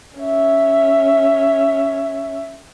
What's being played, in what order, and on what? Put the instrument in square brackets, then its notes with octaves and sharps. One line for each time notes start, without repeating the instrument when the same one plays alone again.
[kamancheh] C#4 E5